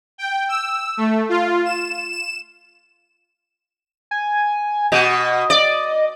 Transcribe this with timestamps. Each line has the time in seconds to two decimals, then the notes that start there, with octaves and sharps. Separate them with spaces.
0.18 G5
0.48 E6
0.97 A3
1.29 F4
1.65 E7
2.11 E7
4.11 G#5
4.92 B2 F#4 D#5
5.50 D5